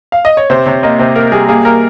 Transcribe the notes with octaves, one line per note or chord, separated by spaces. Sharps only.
F5
D#5
C#5
C3 C5
C3 C#5
A#3 D#5
C3 C5
A#3 A#4
G3 G#4
A#3 G#4
A#3 A#4